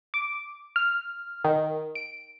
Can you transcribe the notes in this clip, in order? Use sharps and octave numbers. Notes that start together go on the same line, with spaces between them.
D6
F6
D#3
D7